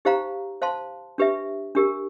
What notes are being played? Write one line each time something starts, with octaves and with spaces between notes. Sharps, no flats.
D#4 G4 C5 F5 A#5
C5 F5 A5 C6
D4 G4 B4 E5
D4 G4 A#4